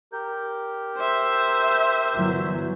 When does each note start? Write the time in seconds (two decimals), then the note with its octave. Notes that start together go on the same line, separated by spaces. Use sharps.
0.13 G4 A#4 G6
0.98 C5 E5
2.16 G1 E3 F#3